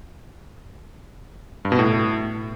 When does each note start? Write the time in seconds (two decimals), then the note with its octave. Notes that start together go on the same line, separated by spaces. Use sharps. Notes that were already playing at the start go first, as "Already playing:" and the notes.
1.65 G2
1.72 B2
1.79 A2